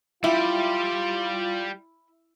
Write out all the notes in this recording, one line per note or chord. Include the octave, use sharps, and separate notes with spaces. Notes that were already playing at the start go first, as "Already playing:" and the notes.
G3 E4 F4 G4